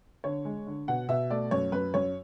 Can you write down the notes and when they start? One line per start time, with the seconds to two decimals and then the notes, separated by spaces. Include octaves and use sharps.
0.24 D3 C#5
0.45 G#3
0.67 D3
0.88 B2 F#5
1.08 B2 E5
1.30 A3 D5
1.51 F#2 C#5
1.72 F#2 B4
1.94 F#2 C#5